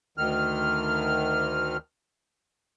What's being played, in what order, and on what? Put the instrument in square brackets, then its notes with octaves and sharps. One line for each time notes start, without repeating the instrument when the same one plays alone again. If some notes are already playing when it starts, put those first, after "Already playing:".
[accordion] D2 D#3 F6